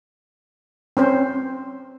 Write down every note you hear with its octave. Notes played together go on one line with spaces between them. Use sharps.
C4 C#4 C5